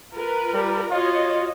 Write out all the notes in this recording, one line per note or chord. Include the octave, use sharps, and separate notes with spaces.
F4 A#4 B4
G3
F4 F#4 C#5 D#5